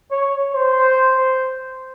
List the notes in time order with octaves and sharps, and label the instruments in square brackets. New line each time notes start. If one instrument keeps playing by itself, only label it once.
[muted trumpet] C#5
C5